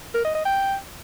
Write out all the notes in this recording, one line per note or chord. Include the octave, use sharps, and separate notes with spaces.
A#4
D#5
D#5
G5